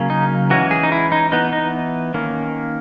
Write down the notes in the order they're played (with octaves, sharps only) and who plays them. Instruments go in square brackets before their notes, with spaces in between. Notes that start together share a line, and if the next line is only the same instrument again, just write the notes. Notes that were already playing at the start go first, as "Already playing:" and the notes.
Already playing: [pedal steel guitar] C#3 F#3 A#3 C#4
D#4
E3 G#3 C#4 F#4
G#4
D#4
E4
D#4
E3 B3 D#4
D#4
D#3 A#3 C#4